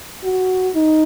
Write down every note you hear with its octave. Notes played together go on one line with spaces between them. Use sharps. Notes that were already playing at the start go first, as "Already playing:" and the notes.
F#4
D#4